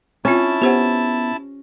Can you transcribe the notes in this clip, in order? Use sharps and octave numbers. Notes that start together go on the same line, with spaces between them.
C4 C#4 E4 F4 A5
B3 G4 C5 F#5